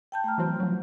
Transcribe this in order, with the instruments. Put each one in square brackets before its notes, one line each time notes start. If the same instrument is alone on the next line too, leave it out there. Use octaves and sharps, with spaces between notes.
[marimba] G5 A5 G6
A3 A#5 F6
[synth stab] E3 F#3 C4
F3 F#3